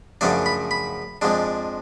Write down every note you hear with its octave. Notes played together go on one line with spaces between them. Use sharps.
F#2 C#3 F3 A3 D4 D5
B5
B5
F2 F3 G#3 D4